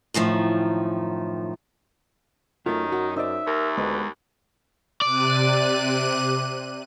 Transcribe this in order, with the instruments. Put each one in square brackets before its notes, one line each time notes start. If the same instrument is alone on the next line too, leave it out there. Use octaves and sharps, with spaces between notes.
[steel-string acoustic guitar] F#2 A2 D#3 F3
[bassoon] F#2 [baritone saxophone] D#3 [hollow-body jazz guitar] A3 F4 [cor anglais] D#4
[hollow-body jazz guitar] F#4
[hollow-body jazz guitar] D#4 C5 D5 [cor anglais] E5
[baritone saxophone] D#2 [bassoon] A#4
[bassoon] D2 [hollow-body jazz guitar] G#3 B3 [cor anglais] B4
[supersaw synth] C3 F#6 D#7 [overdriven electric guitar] D5